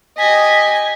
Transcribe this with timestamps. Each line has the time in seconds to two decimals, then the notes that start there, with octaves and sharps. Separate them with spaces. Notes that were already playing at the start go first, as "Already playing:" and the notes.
0.18 G4 D#5 G#5 B6